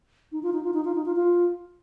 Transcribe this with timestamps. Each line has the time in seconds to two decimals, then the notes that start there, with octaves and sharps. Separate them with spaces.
0.32 D#4
0.43 F4
0.53 D#4
0.63 F4
0.74 D#4
0.85 F4
0.95 D#4
1.05 F4
1.16 F4